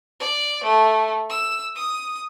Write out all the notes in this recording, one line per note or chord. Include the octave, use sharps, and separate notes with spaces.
D5
A3
E6
D#6